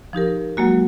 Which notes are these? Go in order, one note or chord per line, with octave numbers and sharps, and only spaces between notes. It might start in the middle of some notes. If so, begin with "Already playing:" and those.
F3 D#4 G4 A#4
F#3 G#3 A#3 F#4